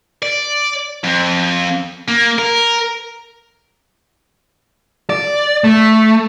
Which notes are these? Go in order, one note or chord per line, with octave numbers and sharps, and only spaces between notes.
D5
F2
A#3
A#4
D5
A3